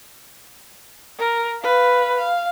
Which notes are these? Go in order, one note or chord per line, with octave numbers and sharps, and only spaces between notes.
A#4
B4 F5
F5